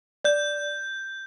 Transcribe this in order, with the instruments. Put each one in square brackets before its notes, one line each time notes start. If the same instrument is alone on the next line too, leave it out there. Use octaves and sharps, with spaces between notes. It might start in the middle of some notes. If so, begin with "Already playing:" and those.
[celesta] D5 [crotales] G6